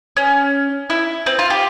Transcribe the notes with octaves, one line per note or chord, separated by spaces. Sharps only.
C#4
E4
C4
F4
G4